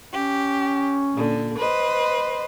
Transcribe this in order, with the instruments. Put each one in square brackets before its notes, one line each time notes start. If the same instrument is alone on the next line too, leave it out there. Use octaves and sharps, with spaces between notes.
[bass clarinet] C#4 [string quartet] G4
[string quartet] A#2 D3
B4 C5 D#5